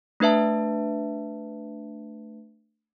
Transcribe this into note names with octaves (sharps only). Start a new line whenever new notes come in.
A3 D4 B4 E5 A5